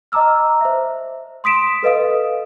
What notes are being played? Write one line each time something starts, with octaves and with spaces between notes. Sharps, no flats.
D#5 A5 A#5 D6 E6 F6
C5 E5
C6 D#6 B6 D7 E7
A4 B4 D#5 F5 D#6